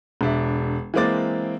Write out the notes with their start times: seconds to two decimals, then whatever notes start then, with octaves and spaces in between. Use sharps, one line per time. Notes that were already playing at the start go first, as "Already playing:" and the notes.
0.21 E1 D4 E5
0.94 E3 G#3 A#3 C4 D6 A6